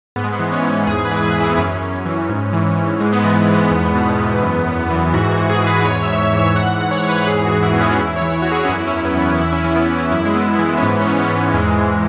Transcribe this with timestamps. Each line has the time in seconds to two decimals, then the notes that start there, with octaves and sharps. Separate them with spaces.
0.16 G#2 B3
0.24 G#3
0.33 B3
0.39 E3
0.52 C#4
0.63 G#2
0.87 E2 G#4
1.05 B4
1.11 E3
1.22 G#4
1.34 E2
1.40 E4
1.50 B3
1.58 F#2 C#4
1.81 F#2
2.06 E3
2.29 G#2
2.53 E3
2.77 G#2
3.00 G#2 G#3
3.13 B3
3.19 G#3
3.24 E3
3.36 B3
3.48 G#2
3.54 B3
3.71 E2
3.95 B2
4.19 E2
4.43 F#2
4.66 F#2
4.90 E3
5.14 G#2 F#4
5.31 F#4
5.37 E3
5.50 G#4
5.61 G#2
5.67 B4
5.85 E2 C#5
6.03 E5
6.08 E2
6.32 E3
6.38 E5
6.56 G#2 F#5
6.80 E3
6.91 C#5
7.03 G#2
7.09 B4
7.27 E2 G#4
7.45 F#4
7.51 E3
7.63 E4
7.73 E2 B3
7.81 C#4
7.98 E2 E4
8.16 C#5
8.22 E3
8.42 E2 F#4
8.52 G#4
8.65 C#4
8.69 F#2 E4
8.79 E4
8.87 C#4
8.93 F#2
9.05 B3
9.17 E3
9.22 E4
9.40 E2 E4
9.52 C#4
9.58 E4
9.64 E3
9.76 B3
9.88 E2
9.93 C#4
10.11 F#2 E4
10.25 G#3
10.35 F#2 B3
10.59 E3 G#3
10.78 C#4
10.82 G#2 B3
11.00 C#4
11.06 E3
11.18 B3
11.30 G#2
11.54 E2 G#3
11.77 E2